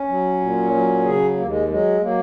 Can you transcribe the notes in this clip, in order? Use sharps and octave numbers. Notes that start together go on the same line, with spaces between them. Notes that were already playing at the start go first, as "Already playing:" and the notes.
Already playing: C#4
F#3
A#2
F#3
C#3 G#4
D#2 A#3
G#3
F#3 G#3
F#3 A#3